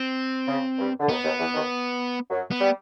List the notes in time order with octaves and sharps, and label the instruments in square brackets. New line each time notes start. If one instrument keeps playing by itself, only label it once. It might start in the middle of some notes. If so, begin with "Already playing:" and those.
Already playing: [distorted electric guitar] C4
[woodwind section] C#3
G2 G3
D3
[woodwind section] D#2 D#3 [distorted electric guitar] B3
[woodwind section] D#2 D#3
E2 E3
D#2 D#3
F#2 F#3
[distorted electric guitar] B3
[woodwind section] G3